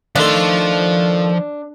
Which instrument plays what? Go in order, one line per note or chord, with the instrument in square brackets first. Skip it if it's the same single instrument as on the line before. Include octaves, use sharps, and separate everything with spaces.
[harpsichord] D#3 A3 A4 [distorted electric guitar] F3 C6 [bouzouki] D4